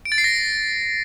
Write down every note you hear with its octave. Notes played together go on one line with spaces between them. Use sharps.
D7
A6
C7
A#6